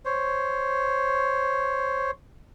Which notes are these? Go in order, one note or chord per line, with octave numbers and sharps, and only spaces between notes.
C5 C#5